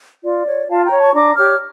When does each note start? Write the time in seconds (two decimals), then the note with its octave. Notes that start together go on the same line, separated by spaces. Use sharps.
0.24 F4 D5
0.47 C#5
0.70 F4 F5 A5
0.84 G5 A#5
0.91 C#5
1.00 A5 C#6
1.14 D4 A#5 D6
1.36 G4 C#5 D6 F6